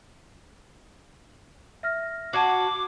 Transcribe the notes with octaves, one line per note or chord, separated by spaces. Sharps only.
E5 F6 A#6
F#4 A5 D6 G#6 C7